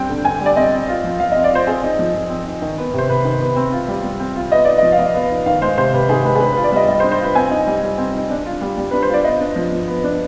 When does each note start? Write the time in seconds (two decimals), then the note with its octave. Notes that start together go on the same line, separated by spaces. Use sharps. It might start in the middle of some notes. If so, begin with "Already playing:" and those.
Already playing: G3 C4 D4 G5
0.09 D3
0.25 D3 G#5
0.41 G3 D5
0.56 C4 D#5
0.73 C4
0.89 F4
1.04 F3
1.20 F3 F5
1.32 C4 D#5
1.44 D5
1.51 F4 C5
1.67 C4 G#4
1.84 D#4
1.99 F3
2.14 F3
2.30 C4
2.46 D#4
2.62 D#3
2.78 B3
2.93 C3 C5
3.09 C3 B4
3.25 D#3
3.41 B3
3.56 C4
3.72 F4
3.88 G3
4.04 G3
4.20 C4
4.36 F4
4.51 B3 D#5
4.65 D#4 D5
4.78 F3 D#5
4.92 F5
4.99 F3 D#5
5.14 B3
5.30 D#4
5.46 D#3 F5
5.61 G#3 C5
5.77 C3 C5
5.94 C3 B4
6.09 D#3 G#4
6.25 G#3 B4
6.36 G#4
6.40 D4 B4
6.52 F4 B4
6.64 D5
6.72 G3 D#5
6.88 G3 D#5
7.00 C5
7.04 D4
7.12 C5
7.19 F4 B4
7.35 C4 G#5
7.51 D#4
7.67 G3
7.83 G3
7.98 C4
8.14 D#4
8.30 D4
8.46 F4
8.61 G3
8.77 G3
8.91 D4 B4
9.02 C5
9.09 F4 D5
9.25 B3 D#5
9.41 D4
9.56 F3
9.72 F3
9.88 B3
10.04 D4